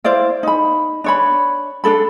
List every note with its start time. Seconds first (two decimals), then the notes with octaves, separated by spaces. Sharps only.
0.04 E4 C5 D5 F5
0.43 D#4 B5
1.04 D4 C#5 B5
1.84 D4 D#4 A4 B5